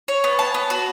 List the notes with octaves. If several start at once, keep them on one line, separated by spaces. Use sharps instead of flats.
C#5
B3
A5
B3
F#4